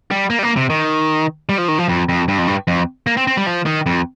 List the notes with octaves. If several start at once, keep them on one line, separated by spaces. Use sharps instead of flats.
G3
A#3
G3
A#3
C3
D#3
G3
F3
D#3
F3
F2
F2
G2
F2
G2
F2
A#3
C4
C4
G3
F3
D#3
F2